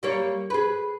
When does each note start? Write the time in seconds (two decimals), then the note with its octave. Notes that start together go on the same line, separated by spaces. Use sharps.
0.03 G3 A#3 C#5
0.50 G#4 B4